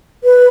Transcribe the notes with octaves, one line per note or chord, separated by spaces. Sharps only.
B4